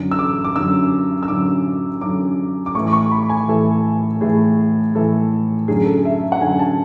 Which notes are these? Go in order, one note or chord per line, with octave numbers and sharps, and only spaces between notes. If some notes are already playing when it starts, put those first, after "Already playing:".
Already playing: F#2 D3
E6
D6
D6
F#2 D3 E6
E6
F#2 D3 D6
F#2 D3 D6
D6
A2 E3 C#6
D6
C#6
B5
G#5
A2 E3 A4
A2 E3 G#4
A2 E3 A4
F#2 D3 G#4
A4
E5
F#5
F#2 D3 G#5
A5